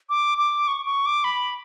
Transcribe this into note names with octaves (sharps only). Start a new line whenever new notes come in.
D6
D6
C#6
C#6
D6
B5